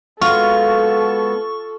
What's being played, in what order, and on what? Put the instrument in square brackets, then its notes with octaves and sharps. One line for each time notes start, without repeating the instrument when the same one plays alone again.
[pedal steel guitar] G#3 B3 F#4 [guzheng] F4 [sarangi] A4 [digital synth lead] C#6